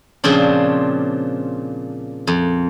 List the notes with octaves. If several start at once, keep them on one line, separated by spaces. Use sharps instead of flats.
A#2 C#3 F3 C4 D4
F2